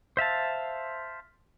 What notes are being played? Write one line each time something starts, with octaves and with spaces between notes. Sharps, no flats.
C5 E5 F5 A5